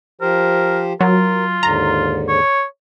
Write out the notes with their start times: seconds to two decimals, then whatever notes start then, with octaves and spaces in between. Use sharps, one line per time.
0.21 F3 G4 A#4 C5
1.01 F#3 F4 A#4
1.63 D#2 G#2 D3 A#5
2.28 C#5